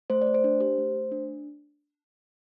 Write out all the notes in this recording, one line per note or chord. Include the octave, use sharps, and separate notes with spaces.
A3 C5
D5
A3
C5
D4
G4 C5
A3
A3
D4